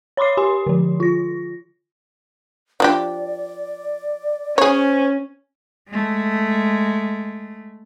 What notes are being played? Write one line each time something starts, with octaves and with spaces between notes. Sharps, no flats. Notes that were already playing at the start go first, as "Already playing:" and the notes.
C#5 B5 C6 D6 C7
G4 G#5 C6
D3 F3
F4 A#6
F3 D4 G4 D5
C#4 G#4 C5 C#5
G#3 A3